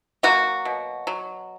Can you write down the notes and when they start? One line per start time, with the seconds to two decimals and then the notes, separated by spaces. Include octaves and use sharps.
0.23 F#3 A#3 F#4
0.65 B2
1.07 F#3